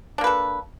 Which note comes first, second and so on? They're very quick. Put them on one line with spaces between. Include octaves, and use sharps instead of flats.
D4 A#3 B4 A4